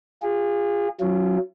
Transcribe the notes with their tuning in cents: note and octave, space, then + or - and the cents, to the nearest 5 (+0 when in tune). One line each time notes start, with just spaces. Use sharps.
F4 +0 G#4 -30
F#3 +0 C#4 +0 F4 -35